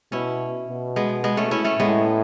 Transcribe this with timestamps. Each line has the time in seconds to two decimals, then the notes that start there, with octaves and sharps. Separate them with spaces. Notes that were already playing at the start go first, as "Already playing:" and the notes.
0.12 B2 C#4 E4
0.68 B2
0.96 G#3 B3
1.24 G#3 B3
1.37 A3 C#4
1.51 C#4 E4
1.65 A3 C#4
1.79 A2 G#3 B3